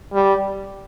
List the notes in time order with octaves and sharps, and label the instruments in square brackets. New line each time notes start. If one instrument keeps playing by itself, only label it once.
[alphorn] G3